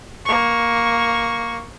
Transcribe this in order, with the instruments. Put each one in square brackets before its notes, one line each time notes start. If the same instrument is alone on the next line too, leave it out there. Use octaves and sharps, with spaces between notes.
[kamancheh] A#3 C#6